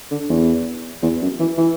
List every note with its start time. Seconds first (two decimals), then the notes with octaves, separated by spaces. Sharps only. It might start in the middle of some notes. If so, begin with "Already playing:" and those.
0.11 D3
0.29 E2
1.02 E2
1.22 F#2
1.39 E3
1.58 E3